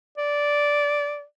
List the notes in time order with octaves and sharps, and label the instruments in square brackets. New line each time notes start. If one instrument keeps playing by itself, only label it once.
[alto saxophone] D5